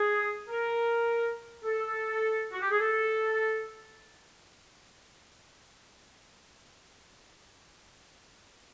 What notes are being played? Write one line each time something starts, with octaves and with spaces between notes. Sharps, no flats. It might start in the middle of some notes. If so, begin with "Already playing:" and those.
Already playing: G#4
A#4
A4
F#4
G4
G#4
A4